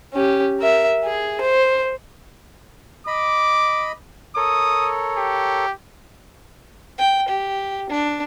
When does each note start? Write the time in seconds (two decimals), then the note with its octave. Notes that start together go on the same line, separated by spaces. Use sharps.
0.14 C#4 G4
0.60 A#4 E5
1.05 G#4
1.41 C5
3.07 D#5 B5 D6
4.36 A4 A#4 C#5 D#6
5.18 G4
6.98 G5
7.28 G4
7.90 D4